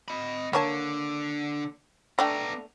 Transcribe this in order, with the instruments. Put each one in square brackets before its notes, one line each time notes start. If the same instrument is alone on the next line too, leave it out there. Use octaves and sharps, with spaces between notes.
[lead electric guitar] D#5 B5
[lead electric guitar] D3 [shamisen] A#3 C#5 A5
[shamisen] A3 D4 G5 [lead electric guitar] B3 A#5